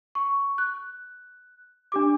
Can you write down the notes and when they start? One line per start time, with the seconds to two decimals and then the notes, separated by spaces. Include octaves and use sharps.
0.15 C#6
0.58 F#6
1.92 D4 G4 D6